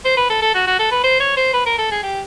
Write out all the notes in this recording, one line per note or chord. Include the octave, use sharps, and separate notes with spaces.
C5
B4
A4
A4
F#4
F#4
A4
B4
C5
C#5
C5
B4
A#4
A4
G#4
G4